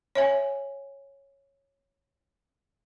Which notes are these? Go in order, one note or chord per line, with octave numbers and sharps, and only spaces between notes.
C#5 E5 G#5